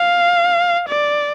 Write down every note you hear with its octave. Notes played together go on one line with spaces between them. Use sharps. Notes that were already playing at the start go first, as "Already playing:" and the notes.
Already playing: F5
D5